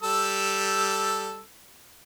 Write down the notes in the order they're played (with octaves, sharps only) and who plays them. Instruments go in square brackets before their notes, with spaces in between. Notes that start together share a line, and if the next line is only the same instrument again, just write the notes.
[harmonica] G3 A4 E6